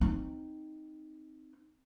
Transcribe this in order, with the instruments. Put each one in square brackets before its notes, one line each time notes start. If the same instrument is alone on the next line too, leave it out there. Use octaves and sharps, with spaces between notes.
[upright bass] C4 D#4